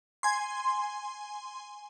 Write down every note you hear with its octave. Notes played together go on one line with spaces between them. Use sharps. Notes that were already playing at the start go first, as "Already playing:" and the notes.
G#5 C6